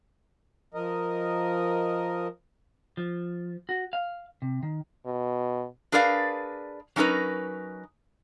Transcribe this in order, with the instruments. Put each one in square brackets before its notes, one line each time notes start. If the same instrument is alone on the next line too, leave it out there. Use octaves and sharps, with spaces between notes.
[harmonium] F3 A#4 D#5
[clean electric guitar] F3
F#4
F5
C3
D#3
[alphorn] B2
[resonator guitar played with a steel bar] D4 G#4 A#4 B4 D5 F5
F#3 C#4 D#4 A#4 B4